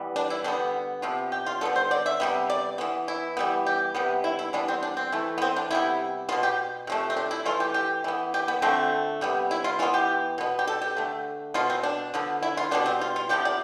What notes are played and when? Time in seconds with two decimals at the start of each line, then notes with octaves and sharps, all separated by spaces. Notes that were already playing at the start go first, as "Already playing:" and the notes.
Already playing: E3 G3 B3
0.16 D4
0.30 E4
0.44 D3 G3 B3 D4
1.02 C3 F3 B3
1.32 G4
1.46 F4
1.61 D3 G3 B3 A4
1.76 C5
1.91 D5
2.06 E5
2.20 C3 G3 B3
2.50 D5
2.78 E3 B3
3.08 E4
3.37 E3 G3 B3
3.66 G4
3.95 C3 G3 B3
4.24 E4
4.39 E4
4.53 E3 G3 B3 D4
4.68 C4
4.83 D4
4.97 C4
5.12 E3 A3
5.38 B3
5.42 C4
5.56 D4
5.71 C3 G3 B3 E4
6.29 B3 F4
6.32 B2
6.43 G4
6.87 C3 F3 A3
7.10 C4
7.17 D4
7.31 E4
7.45 E3 A3 F4
7.60 G4
7.74 G4
8.04 E3 B3
8.34 G4
8.48 B3
8.62 D3 F3 A3 C4
9.21 C3 G3 B3
9.51 E4
9.64 F4
9.79 E3 F4
9.82 B3
9.94 G4
10.38 B2 B3
10.59 G4
10.67 A4
10.82 G4
10.97 D3 A3
11.54 B2 B3 F4
11.70 C4
11.83 D4
12.14 D3 F3 B3
12.43 E4
12.57 F4
12.71 B2 G3 B3 D4
12.86 C4
13.01 F4
13.16 F4
13.29 C3 F3 B3 G4
13.45 D5